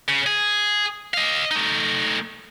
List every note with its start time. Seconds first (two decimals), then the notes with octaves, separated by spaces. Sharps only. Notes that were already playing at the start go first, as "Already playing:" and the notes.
0.08 C#3
0.27 G#4
1.14 D#5 F5
1.51 A3 D#4